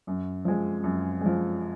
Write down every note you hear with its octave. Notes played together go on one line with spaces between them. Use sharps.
F#2
F3 G#3
F#2
F3 G#3